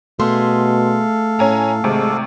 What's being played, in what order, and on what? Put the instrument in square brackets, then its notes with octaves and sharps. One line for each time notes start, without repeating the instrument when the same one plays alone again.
[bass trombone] B2 [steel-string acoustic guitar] A3 G#4 [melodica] A4 F5 [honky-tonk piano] C6
[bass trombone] A2 [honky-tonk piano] C#4 G#5 A#5
[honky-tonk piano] G#1 C3 [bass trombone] G#3